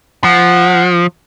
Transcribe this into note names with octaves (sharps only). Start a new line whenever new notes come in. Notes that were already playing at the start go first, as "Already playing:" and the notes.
F3 F#5